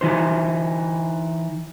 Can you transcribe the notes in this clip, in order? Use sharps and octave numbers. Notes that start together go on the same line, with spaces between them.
E3 D#4 C5